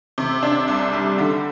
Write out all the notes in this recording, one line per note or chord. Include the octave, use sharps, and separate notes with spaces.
C3
D4
C2
G3
D3